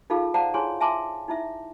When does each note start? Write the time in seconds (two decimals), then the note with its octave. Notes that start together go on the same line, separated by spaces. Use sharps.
0.10 D#4 F4 G#4 A4 F5
0.34 C5 D5 F5 F#5 A5 A#5
0.54 E4 G#4 C#5 G#5 C6
0.80 E5 G#5 A5 C6 D6
1.28 D#4 E4 E5